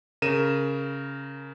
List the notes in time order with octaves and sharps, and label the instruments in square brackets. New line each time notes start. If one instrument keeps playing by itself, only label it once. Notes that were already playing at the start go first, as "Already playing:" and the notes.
[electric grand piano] C#3 A#4 D#7 E7